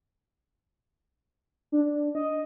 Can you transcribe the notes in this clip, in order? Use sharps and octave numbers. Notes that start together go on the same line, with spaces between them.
D4
D#5